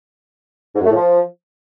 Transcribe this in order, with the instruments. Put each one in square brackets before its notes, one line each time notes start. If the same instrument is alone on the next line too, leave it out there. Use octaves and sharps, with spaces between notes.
[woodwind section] G#2
F#2
A3
A2
F3